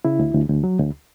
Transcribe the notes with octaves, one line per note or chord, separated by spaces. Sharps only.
C#3 E4
D2
D2
D2
F#3
D2